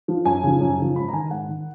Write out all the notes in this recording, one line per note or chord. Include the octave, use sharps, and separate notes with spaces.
F3
F#2 G#5
C#3 F3
F#2
C#3 F3
G#2 B5
A#5
D#3 G#5
G#2 F#5
D#3